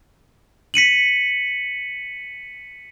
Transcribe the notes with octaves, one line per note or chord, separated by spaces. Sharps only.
B6 C#7 D#7 F#7